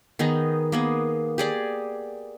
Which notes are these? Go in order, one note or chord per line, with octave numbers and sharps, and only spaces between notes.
D#3 B3 D#4 G#4
A#3 B3 G#4
G4 G#4 D5